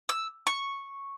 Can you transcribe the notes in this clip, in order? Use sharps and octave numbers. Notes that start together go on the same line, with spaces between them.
E6
C#6